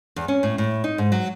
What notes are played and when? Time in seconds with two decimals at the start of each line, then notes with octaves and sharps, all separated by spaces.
0.16 E2
0.28 C#4
0.43 A2
0.58 A2
0.84 D#4
0.98 G#2
1.12 F#3